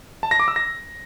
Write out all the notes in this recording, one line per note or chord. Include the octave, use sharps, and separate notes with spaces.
A5
A#6
D6
E6
A#6